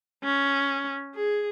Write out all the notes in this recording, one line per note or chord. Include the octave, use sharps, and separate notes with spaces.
C#4
G#4